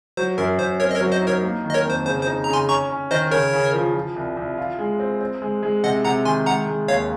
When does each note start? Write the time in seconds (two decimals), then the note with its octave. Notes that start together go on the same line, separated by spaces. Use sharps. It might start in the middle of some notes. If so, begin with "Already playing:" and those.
0.17 F#3 C5
0.38 F#2 A#4
0.59 F#2 C5
0.80 C4 A#4 C#5
0.91 D#5
0.95 A#4 C#5
1.01 F#3
1.11 C5 D#5
1.22 D#4
1.27 A#4 C#5
1.43 A#3
1.64 D#3
1.70 D#5
1.74 A#4 C#5
1.85 F2 C5
2.06 C#3 C5
2.22 C5
2.27 D#4
2.44 C#3 A#5
2.53 G#5 C6
2.69 C#4 A#5 C#6
2.90 C#4
3.11 D#3 C5 D#5
3.31 C#3 A#4 C#5
3.53 C#3
3.74 F3
3.94 F3
4.16 C2
4.37 C2
4.58 F4
4.79 G#3
5.00 C4
5.21 C4
5.42 G#3
5.63 G#3
5.83 C3 D#5 F#5
6.05 C3 F#5 A#5
6.25 D#3 G#5 C6
6.46 G#3 F#5 A#5
6.67 G#3
6.88 D#2 C#5 F5